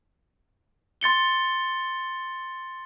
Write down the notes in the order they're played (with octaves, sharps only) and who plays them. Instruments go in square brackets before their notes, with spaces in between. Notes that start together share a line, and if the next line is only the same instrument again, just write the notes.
[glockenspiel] C6 A6 C#7 G7